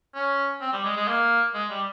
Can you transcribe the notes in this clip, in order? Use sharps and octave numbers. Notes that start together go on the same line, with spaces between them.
C#4
C4
G3
G#3
G#3
A#3
G#3
G3